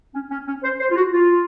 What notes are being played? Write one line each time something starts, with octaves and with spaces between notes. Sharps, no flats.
C#4
C#4
C#4
C5
C5
F4
F#4
F4